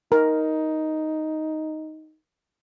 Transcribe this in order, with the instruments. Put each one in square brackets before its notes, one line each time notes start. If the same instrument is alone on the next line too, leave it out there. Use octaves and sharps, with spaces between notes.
[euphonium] D#4 [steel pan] A#4